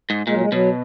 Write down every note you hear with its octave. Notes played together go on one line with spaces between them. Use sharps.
G#2
A#2 G#3
F#3
G#3
B2 F#3